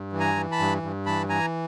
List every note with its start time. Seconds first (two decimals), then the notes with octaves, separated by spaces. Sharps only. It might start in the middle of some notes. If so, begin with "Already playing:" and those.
Already playing: G2
0.13 E3
0.20 G#5 A#5
0.35 E3
0.52 A5 B5
0.59 G2
0.83 G2
1.06 E3 A5 B5
1.29 E3 G#5 A#5